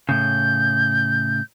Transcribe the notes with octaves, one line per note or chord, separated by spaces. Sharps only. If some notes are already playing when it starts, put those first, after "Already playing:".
A2 C#3 G6